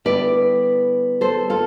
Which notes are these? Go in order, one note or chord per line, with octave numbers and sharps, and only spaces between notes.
D3 G3 B3 E4 B4 D5
A4 C5
F4 A4